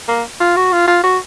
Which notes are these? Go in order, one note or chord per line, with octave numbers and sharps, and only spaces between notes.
A#3
F4
F#4
F4
F4
F#4